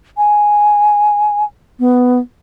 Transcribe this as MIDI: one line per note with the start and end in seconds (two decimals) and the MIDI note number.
0.17 1.44 80
1.80 2.19 59